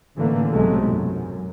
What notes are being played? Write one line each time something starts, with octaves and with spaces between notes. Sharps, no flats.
A1 D3 E3 A3 A#3
B1 G#2 C3 F#3 G#3 A3
F#2